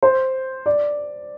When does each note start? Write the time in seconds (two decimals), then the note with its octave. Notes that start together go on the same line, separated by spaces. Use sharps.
0.03 C5
0.66 D5